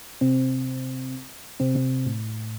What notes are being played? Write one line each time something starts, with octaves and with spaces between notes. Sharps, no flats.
C3 C4
C3 C4
C3 C4
A2